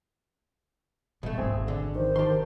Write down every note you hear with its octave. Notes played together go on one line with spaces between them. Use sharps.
D1 B2 G3 A3
D1 G#1 C4 G#4
D3
C3 D#3 C5
D#3 G4 A5 C6